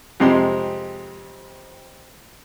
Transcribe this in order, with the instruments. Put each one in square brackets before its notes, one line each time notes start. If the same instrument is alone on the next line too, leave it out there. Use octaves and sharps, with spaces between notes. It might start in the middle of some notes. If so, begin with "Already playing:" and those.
[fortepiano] F2 C3 G#3 C4 C6